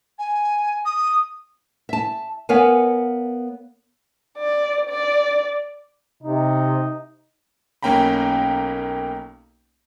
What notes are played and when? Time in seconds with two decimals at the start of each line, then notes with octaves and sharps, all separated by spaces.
0.19 G#5
0.85 D#6
1.89 E5 A5
2.49 B3 A#4 C#5 F5 G#5
4.38 D5
4.89 D5
6.23 C3 D#4
7.83 B1 A#3 C#4 G5 A#5 B5